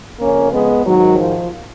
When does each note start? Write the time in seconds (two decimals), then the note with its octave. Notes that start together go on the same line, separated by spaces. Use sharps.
0.20 F2 C#3 A#3 C#4
0.52 G#3 B3
0.85 G#2 D#3 F#3
1.17 F3